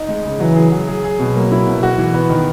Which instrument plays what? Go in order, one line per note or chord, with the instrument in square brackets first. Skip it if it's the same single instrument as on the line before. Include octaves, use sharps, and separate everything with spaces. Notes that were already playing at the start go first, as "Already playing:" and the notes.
Already playing: [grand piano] D#4
G#3
C#3
[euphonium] E3 [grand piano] F#3
[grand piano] G#4
F#3
G#4
G#4
B2
[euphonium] F#3 [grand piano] A#3
[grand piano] E4
B2
F#4
E3
B3
D#3